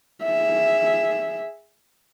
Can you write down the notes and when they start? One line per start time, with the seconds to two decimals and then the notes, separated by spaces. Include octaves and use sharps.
0.23 G#4 E5